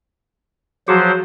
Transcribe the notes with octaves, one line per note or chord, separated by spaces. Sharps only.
F3 F#3 F#4 G#4 C5